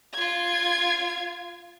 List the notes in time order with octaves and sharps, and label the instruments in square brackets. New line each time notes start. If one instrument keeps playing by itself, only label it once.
[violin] F4 G#6